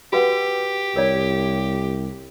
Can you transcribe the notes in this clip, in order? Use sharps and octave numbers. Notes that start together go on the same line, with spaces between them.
F#4 G4 B4 F#5
C2 A#4 C#5 D5